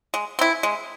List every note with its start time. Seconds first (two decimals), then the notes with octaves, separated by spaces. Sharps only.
0.14 G#3
0.39 C4 E4
0.63 G#3